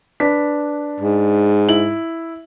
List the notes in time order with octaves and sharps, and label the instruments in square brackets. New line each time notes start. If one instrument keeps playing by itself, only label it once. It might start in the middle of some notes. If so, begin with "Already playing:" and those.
[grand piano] D4 B4 B6
[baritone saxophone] G#2
[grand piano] E4 F#7